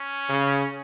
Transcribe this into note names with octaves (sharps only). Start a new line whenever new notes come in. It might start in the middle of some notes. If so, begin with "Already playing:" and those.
Already playing: C#4
C#3